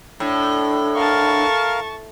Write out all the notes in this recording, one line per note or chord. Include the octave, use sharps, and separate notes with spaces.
A2 D4
A#4 F5 A5 C#6